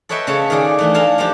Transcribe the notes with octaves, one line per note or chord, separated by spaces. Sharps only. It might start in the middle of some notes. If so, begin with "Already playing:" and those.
A4 B4 C#5 D#5 E5 G5
C#3 A4 C#5 A5
D#3 A#3 G#4 D5
E3 A3 D4
E4 A4 F5 A5 A#5
F3 G3 A#3 D4 G4